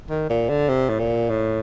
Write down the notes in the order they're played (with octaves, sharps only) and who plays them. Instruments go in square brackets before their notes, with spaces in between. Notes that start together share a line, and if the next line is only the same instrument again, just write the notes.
[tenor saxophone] D#3
A#2
D3
C3
A2
A#2
A2